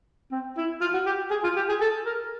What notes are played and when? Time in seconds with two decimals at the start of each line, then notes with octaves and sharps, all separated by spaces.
0.31 C4
0.57 E4
0.81 F4
0.93 F#4
1.06 G4
1.30 G#4
1.43 F4
1.56 G4
1.68 G#4
1.80 A4
2.05 A#4